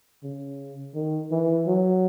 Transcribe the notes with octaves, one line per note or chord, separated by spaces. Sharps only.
C#3
D#3
E3
F#3